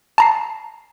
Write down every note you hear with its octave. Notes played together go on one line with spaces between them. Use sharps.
A5 A#5 C7